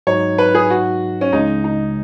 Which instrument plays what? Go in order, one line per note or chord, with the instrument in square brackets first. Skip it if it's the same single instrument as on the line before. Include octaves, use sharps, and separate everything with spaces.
[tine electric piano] G#2 F#3 D#4 [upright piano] C#5
[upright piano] B4
G#4
F#4
C#4
[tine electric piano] C#2 C#3 G#3 [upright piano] D#4
[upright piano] D#4